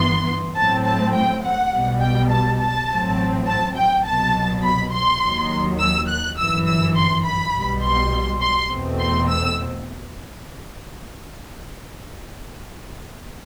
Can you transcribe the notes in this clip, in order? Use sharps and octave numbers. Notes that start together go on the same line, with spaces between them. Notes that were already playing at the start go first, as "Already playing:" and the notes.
Already playing: G1 G2 E3 B3 C6
A2 F#3 C4 A5
A5
G5
F#5
B1 B2 G3
G5
A5
A5
A1 A2 F#3 C4
A5
G5
C2 B2 F#3 A5
B5
C6
D#2 D#3 F#3
E6
F#6
G1 F#2 E3 E6
E6
C6
B5
B1 B2 G3
C6
C6
E2 B2 A3 C4
C6
E6